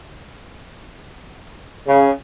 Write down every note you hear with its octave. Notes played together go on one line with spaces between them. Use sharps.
C#3